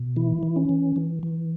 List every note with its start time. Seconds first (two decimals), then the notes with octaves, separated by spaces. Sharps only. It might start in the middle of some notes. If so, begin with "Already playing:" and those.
Already playing: B2
0.16 E3 E4
0.43 E3
0.56 C#4
0.69 E3
0.96 E3
1.23 E3